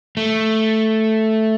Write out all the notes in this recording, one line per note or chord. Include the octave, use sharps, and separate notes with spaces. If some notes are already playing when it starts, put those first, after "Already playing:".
A3